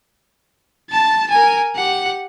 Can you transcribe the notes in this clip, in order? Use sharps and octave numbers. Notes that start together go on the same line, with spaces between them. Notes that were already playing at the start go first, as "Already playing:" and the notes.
A5 A6
A#4 G#5
G4 F#5